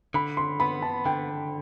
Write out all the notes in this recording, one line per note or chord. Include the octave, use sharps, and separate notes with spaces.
D3 B5
C6
B3 B5
A5
D3 G5